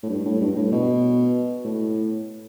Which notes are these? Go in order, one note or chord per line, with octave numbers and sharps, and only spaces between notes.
A2
G2
A2
G2
A2
B2
A2